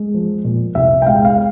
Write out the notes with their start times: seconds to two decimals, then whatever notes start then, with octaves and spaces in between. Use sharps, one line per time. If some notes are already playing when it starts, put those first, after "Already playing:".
Already playing: G#3
0.14 F3
0.44 A#2
0.75 C2 E5
1.02 G5
1.06 G#3 F5
1.25 F5